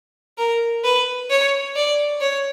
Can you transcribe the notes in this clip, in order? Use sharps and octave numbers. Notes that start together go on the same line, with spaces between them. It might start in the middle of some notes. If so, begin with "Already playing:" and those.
A#4
B4
C#5
D5
C#5